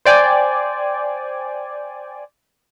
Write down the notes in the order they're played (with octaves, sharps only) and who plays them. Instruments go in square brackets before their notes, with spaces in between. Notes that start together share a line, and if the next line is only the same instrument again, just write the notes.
[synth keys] C5 D5 G5 G#5